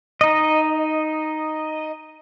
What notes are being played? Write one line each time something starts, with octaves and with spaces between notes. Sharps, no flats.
D#4 D#5